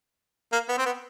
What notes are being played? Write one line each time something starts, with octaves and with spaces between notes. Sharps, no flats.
A#3
B3
C4
B3